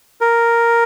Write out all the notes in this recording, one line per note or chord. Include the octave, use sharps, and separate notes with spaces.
A#4